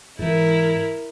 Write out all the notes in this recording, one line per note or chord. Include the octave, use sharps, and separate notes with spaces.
G#2 E3 E4 A#4